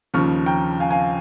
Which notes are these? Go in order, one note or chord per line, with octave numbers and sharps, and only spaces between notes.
D#2 C#3 F3 C#6 F6
G5 A#5
F5 G#5
F5 G#5